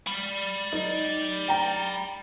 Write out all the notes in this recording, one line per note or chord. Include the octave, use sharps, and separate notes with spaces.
D5 B5
D#4
G5 A#5